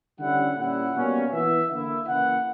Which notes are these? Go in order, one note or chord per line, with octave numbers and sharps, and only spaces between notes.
D3 G3 C#4 E4 F#5
A#2 G3 C#4 E4 F#5
B2 G3 A#3 C#4
E3 B3 E4 E5
D3 A#3 E4 E5
C#3 E3 A#3 E4 F#5